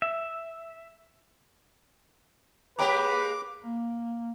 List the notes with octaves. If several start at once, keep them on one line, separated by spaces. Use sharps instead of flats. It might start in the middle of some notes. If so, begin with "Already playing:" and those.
E5
G#3 A#3 G4 B4 C#5 G5 A#5 D6
A#3